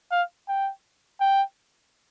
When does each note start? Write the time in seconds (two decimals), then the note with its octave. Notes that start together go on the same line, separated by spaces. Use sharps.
0.11 F5
0.49 G5
1.20 G5